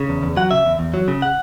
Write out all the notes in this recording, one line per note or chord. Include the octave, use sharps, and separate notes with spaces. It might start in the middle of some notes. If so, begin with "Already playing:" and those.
Already playing: C#3
E2
E2
F#3 F#5
C#3 E5
E2
E2
F#3
C#3
F#5